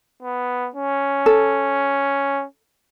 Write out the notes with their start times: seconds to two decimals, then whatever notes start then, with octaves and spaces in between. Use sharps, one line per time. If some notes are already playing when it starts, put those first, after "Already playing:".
0.23 B3
0.75 C#4
1.26 A4